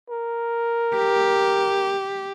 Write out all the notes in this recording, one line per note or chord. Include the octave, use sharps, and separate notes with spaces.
A#4
G4